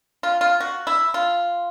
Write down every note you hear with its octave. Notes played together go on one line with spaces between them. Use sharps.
F4
F4
F#4
E4
F4